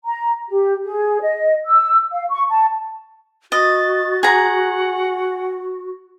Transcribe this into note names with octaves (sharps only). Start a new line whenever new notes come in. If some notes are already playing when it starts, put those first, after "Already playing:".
A#5
G4
G#4
D#5
E6
F5
C#6
A5
F#4 D#5 A6
G#4 F#5 A#5